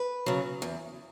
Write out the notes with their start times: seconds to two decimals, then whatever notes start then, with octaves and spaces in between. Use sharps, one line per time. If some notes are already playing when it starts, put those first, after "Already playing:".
Already playing: B4
0.26 C#3 F#3
0.62 E2